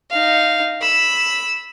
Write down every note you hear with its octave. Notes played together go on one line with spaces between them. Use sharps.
D#4 F5
B5 E6